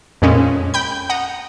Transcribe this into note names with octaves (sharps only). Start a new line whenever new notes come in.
F2 A#2 G#3 C#4
G5 B5 G6
F#5 A#5 D#6